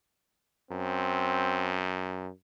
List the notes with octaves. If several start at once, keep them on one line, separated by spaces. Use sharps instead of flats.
F#2 C4